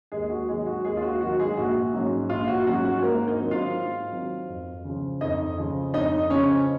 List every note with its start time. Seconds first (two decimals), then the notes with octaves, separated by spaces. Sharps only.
0.12 D#2 G#3 G#4
0.30 F#4
0.48 D#3 F#3 G#3 G#4
0.67 F#4
0.84 D#2 G#3 G#4
0.97 F4
1.02 F#4
1.21 D#3 F#3 F#4
1.39 G#3 G#4
1.57 A#1 F#4
1.94 G#2 F#3 C#4
2.30 A#1 F4
2.48 F#4
2.67 G#2 F#3 C#4 F#4
2.85 F#4
3.02 G#2 A#3 A#4
3.28 D#4 D#5
3.39 D#3 F#3 C4
3.51 F4 F5
3.76 G#2
4.12 D#3 F#3 C4
4.48 F2
4.84 C#3 F3
5.21 F2 D#4 D#5
5.58 C#3 F3
5.94 F2 D#4 D#5
6.30 C#3 F3 C#4 C#5